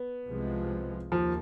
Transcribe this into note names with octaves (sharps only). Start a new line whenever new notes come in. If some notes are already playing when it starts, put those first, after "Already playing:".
Already playing: B3
C2 C3 F3 G#3
D#2 F3